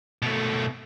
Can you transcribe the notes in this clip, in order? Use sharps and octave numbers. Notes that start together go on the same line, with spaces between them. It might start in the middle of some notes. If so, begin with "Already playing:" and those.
B2 A3